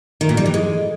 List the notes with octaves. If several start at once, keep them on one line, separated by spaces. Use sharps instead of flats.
D#3
A#2
G3
E3
G#3